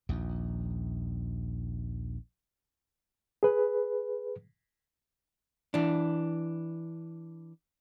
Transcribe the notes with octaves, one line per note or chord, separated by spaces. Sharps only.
A#1 D#2
G#4 B4
E3 D4